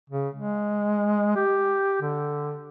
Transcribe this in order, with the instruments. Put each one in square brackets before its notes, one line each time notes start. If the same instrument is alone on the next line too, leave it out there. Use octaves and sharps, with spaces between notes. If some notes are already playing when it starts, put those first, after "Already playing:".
[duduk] C#3
G#3
G4
D3